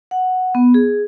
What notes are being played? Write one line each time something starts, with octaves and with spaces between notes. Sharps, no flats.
F#5
B3
G#4